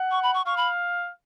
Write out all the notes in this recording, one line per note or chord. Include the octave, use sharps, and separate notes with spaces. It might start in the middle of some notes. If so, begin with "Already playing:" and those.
Already playing: F#5
C#6
B5
C#6
F5 C#6
B5